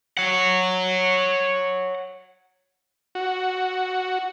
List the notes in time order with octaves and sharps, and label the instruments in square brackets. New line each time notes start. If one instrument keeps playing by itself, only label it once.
[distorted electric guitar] C#5 F#5
[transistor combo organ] F#4